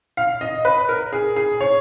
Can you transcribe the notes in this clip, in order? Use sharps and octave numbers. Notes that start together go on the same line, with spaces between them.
F5
D#5
B4
A#4
G#4
G#4
C#5